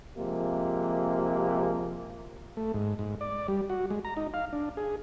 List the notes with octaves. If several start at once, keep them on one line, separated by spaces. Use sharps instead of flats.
C3 F3 G#3 A#3
A3
G#2
G#2
D5
G3
F#4
G#3
A#5
D#4
F5
D4
G#4